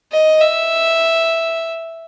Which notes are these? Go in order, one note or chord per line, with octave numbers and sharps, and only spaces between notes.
D#5
E5